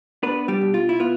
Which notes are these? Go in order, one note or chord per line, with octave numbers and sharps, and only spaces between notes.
B3 D4 B4
G3 G4
B2
F4
E4
B3 F4